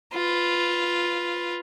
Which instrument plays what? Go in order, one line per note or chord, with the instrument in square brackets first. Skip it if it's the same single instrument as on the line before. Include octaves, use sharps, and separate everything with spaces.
[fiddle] F4 B4